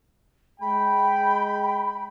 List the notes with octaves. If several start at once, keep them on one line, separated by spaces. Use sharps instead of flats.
G#3 G5 B5